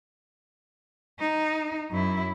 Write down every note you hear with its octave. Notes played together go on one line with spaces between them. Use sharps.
D#4
F#2 E4